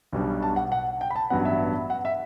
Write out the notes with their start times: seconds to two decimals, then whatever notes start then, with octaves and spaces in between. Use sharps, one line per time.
0.13 B1 B2 G3 D4
0.42 A5
0.56 F#5
0.72 F#5
1.01 G5
1.10 B5
1.16 A5
1.30 A1 G2 F#3 B3 F#5
1.45 E5
1.90 F#5
2.05 E5